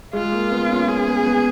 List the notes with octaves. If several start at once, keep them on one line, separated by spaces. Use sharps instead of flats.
G#3 F4
A#3
B3
C#4
C#4 G#4
B3
B3